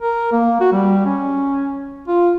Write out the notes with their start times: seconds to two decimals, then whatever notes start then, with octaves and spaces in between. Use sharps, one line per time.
0.02 A#4
0.32 A#3
0.60 F#4
0.72 G3
1.05 C#4
2.08 F4